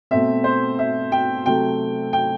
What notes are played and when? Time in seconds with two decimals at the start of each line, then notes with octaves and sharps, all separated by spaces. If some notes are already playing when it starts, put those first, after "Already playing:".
0.11 B2 A3 C4 E5
0.44 C5
0.79 E5
1.12 G5
1.46 C3 F#3 A3 C4 G5
2.13 G5